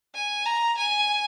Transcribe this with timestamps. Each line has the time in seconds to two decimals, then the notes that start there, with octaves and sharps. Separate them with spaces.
0.14 G#5
0.45 A#5
0.77 G#5